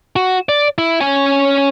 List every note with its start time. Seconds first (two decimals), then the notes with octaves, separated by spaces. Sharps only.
0.16 F#4
0.49 D5
0.78 E4
1.01 C#4 G#5